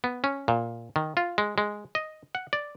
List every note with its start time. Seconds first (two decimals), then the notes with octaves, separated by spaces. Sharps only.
0.04 B3
0.24 C#4
0.48 A#2
0.96 D#3
1.17 F4
1.38 G#3
1.58 G#3
1.95 D#5
2.35 F#5
2.53 D5